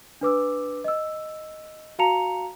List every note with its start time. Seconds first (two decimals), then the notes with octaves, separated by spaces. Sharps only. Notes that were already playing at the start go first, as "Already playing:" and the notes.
0.21 D4 B4 D6 E6
0.84 D#5 E6
1.99 F#4 F5 A5 A#5 C#7 F7